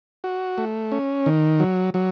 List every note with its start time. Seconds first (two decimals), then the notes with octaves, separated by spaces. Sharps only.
0.24 F#4
0.58 A3
0.92 C#4
1.26 D#3
1.60 F#3
1.94 F#3